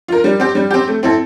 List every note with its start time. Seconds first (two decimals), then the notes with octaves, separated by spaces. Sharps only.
0.08 F4 A#4
0.24 G3
0.40 C4 G4
0.55 G3
0.71 C4 G4
0.88 A3
1.03 C4 E4 A4